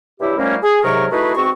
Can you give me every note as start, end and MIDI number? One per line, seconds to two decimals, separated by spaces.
0.20 0.36 43
0.20 0.36 54
0.20 0.36 64
0.20 0.36 67
0.20 0.36 76
0.37 0.56 51
0.37 0.56 53
0.37 0.56 55
0.37 0.56 57
0.37 0.56 58
0.37 0.56 61
0.62 0.79 68
0.83 1.05 36
0.83 1.05 44
0.83 1.05 48
0.83 1.05 54
0.83 1.05 70
0.83 1.05 85
1.11 1.34 57
1.11 1.34 63
1.11 1.34 64
1.11 1.34 66
1.11 1.34 68
1.11 1.34 71
1.35 1.50 40
1.35 1.50 44
1.35 1.50 60
1.35 1.50 66
1.35 1.50 85